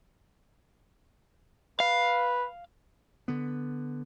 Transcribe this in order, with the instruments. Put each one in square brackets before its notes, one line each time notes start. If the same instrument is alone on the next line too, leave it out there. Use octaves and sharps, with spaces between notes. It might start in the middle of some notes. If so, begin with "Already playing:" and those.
[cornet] B4 [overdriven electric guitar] F5
[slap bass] D3 B3